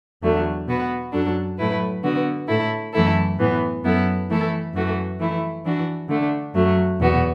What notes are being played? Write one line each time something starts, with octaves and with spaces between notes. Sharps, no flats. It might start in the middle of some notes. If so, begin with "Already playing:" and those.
E2 D3 F#3 A3
B2 B3 F#4 B4
F#2 F#3 D4 A4
A2 F#3 A3 E4 B4
D3 B3 F#4
A2 A3 E4 A4
F#2 E3 A3 E4 A4
A2 E3 B3
F#2 F#3 B3 E4 A4
E3 A3 E4 A4
F#2 E3 A3 F#4
E3 A3 E4
E3 D4 F#4
D3 A3 D4
F#2 F#3 A3
E2 B2 B3 F#4